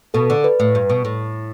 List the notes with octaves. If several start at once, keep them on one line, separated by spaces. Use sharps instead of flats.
B2 A4
D3
B4
A2
G2
B2
A2